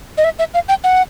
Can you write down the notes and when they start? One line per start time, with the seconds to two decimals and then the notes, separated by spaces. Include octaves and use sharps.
0.18 D#5
0.24 E5
0.39 E5
0.54 F5
0.69 G5
0.84 F#5